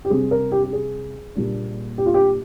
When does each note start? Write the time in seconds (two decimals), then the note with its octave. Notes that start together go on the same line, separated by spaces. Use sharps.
0.05 G4
0.10 C3 G3 C4 G#4
0.31 A#4
0.52 G4
0.64 G4
0.73 G#4
1.35 A#2 G3 A#3 D4
1.98 G4
2.06 F4
2.14 G4